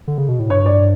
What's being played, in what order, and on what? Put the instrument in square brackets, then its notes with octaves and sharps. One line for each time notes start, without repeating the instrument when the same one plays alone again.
[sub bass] D3
C#3
B2
A2
[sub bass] G2 [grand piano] C#5
[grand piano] D5